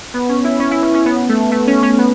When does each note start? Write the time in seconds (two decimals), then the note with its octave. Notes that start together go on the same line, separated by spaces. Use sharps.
0.14 B3
0.29 C#4
0.44 E4
0.60 C#4
0.71 E4
0.83 C#4
0.94 C#4
1.06 B3
1.29 A3
1.51 A3
1.67 C#4
1.83 C#4
1.98 B3